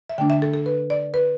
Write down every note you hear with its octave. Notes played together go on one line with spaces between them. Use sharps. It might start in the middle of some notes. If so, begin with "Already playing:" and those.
E5
D3 A3 D4 G5
E5
A4
A4
B4
D5
B4